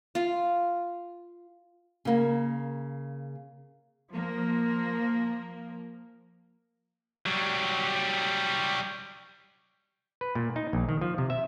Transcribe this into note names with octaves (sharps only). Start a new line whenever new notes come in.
F4 F5
C#3 A#3
F3 A#3
F#3 G3
B4
A#2
D#4
A#1
D#3
F3
C3
E5